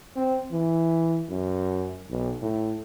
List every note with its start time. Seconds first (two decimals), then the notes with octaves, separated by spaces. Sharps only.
0.16 C4
0.52 E3
1.30 F#2
2.10 B1
2.42 A2